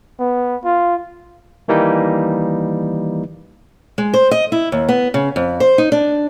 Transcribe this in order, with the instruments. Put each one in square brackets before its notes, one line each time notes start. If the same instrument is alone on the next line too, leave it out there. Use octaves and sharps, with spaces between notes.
[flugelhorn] B3
F4
[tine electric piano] D#3 E3 G3 A#3 D#4
[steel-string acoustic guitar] G#3
C5
D#5
E4
D#2
B3
C#3
F2
C5
D#4
D4